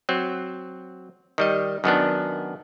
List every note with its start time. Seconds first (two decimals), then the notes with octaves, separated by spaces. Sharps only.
0.09 F#3 C4
1.38 D#3 G3 D#5
1.84 F#2 D#3 B3 D4